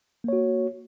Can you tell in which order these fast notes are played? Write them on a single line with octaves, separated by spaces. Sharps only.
A#3 C#5 F#4